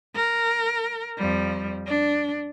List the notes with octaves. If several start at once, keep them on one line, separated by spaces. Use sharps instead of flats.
A#4
F2 G3
D4